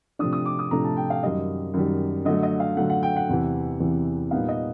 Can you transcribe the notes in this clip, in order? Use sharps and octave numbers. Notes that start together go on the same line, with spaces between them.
C3 F3 A3 D4 D#6
D#6
D6
D#6
C3 F3 A3 D4 A#5
A5
G5
F5
F#2 D#3 G3 D#5
F#2 D#3 G3
D3 F#3 A3 D#5
D#5
F5
D3 F#3 A3 F#5
F#5
G5
F#5
E2 C3 E3
E2 C3 E3
A#2 G3 B3 D#4 F5
D#5